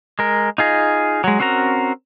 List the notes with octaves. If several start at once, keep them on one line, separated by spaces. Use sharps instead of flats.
G#3 A#4
D#4 F4 G#4 D#5
F#3 G#3
C4 C#4 F#4 A#4 A#5